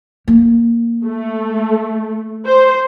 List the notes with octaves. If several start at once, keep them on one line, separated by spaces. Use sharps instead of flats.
A#3
A3
C5